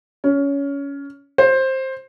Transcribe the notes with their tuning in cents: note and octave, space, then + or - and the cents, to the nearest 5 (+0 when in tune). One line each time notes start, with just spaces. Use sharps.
C#4 +20
C5 +15